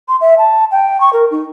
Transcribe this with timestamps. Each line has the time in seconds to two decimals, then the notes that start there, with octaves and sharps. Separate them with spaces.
0.08 C6
0.21 E5
0.38 A5
0.72 G5
1.00 C#6
1.13 A#4
1.31 D#4